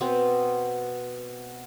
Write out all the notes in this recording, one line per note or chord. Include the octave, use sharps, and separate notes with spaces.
B2 B3 C4